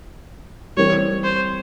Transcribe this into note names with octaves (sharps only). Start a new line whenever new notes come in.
E3 G3 C4 C#5
C5